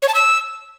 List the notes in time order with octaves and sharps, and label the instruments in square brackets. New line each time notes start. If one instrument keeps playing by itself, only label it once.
[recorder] C#5
A5
E6